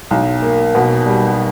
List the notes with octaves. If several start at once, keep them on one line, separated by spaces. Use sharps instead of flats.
B1
A#3
B2
G3